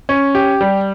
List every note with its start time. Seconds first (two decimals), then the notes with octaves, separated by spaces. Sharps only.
0.09 C#4
0.35 G4
0.61 G3